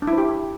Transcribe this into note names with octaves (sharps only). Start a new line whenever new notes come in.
D4
E4
C5
G4